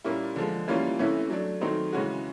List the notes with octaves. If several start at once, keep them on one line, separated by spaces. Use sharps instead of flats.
A#2 G3 A#3 C#4 E4
D3 F3 G#3
E3 G3 A#3 C#4 F4
C3 E3 A3 C#4 E4
F#3 A3 D4
D#3 F#3 A3 C4 D#4
C#3 E3 G#3 C#4 F#4